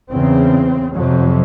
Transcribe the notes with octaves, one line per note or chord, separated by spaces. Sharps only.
E2 C#3 C4
F2 C3 F#3